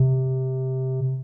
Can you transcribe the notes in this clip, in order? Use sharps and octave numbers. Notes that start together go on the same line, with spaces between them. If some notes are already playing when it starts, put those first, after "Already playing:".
Already playing: C3